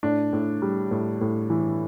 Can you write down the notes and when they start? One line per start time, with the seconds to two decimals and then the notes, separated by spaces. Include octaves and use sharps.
0.03 A2 D4
0.33 A2
0.62 G3
0.91 A2
1.21 A2
1.50 E3